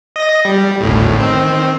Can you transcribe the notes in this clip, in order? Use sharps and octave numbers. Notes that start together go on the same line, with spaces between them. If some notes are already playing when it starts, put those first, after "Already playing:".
D#5 A#6
G3
G#1 D2 A2
D#3 C4